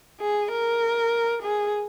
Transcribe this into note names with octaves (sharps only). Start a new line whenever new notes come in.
G#4
A#4
G#4